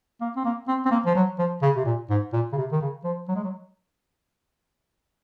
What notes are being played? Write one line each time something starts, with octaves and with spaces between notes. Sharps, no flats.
A#3
C4
A#3
C4
C4
A#3
F3
F#3
F3
C#3
C3
A#2
G#2
A#2
C#3
C3
D#3
C#3
F3
F#3
G#3
F#3